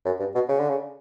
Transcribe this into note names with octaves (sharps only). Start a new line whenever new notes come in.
F#2
G2
B2
C#3
D3
C#3